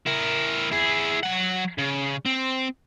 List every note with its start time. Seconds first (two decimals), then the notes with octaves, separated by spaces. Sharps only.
0.06 E4 A#4
0.71 E4 G#4
1.23 F#3 F#5
1.78 C#3
2.26 C4